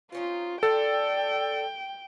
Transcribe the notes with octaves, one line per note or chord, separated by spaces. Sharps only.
C4 C#4 D#4 F4
D4 A4 C5 G5